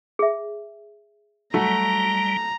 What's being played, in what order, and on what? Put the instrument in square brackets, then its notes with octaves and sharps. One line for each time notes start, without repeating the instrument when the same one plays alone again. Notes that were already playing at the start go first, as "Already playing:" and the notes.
[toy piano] G#4 E5
[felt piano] F#3 A3 F#4 [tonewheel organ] G3 [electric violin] A#5